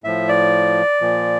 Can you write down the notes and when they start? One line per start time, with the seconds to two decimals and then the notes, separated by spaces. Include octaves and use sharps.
0.04 A2 F3 E5
0.29 D5
1.01 A#2 F3